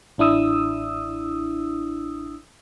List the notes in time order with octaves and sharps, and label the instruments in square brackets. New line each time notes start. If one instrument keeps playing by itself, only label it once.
[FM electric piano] A1 D4 E4 D#6 E6